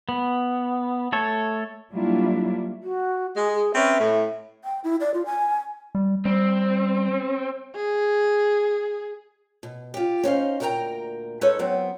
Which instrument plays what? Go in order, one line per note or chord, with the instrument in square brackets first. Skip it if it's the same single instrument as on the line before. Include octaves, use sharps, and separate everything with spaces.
[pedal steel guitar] B3
A3 A4 C#5
[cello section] F#3 G3 A#3 D4 E4 F4
[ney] F#4
[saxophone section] G#3 [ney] G#4
[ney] G#4
[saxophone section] C4 C#4 B4 [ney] E5
[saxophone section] A2
[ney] G5
E4
D5
F4
G#5
[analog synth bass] G3
[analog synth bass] G3 [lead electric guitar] C4
[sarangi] G#4
[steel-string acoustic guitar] B2
F4 G4
C#4 D#4 C5 F5
D2 A#2 A#4 F#5 G5 A#5
G#3 D#4 A4 B4 C#5
F#3 B3 C4